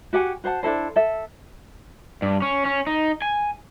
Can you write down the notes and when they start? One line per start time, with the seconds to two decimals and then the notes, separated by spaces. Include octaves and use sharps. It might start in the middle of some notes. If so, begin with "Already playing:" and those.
0.13 F#4 G4 F#5 G#5
0.44 F#4 C5 F#5 A5
0.63 D4 E4 A4 C5
0.96 A4 E5
2.22 G2
2.42 C#4
2.65 C#4
2.87 D#4
3.22 G#5